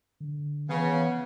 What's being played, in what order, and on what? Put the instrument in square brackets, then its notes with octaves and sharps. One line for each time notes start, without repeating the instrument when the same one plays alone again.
[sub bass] D3
[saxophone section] C#3 [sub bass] E3 [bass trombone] B3